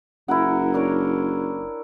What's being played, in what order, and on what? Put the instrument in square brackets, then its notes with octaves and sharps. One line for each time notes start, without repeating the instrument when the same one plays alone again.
[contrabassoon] F#1 [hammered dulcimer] E4 A#4 F#5
[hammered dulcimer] D4 A#4 C#5